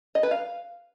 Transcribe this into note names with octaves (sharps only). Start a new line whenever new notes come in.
D#5
B4
F5